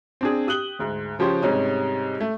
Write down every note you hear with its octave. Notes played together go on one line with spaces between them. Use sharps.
C4 D4 G#4
G4 D#6 F#6 F#7 G7
D2 G#2
C#3 F3 G4 C5 C#5
G#2 C3 G3 C#4 D#4
A3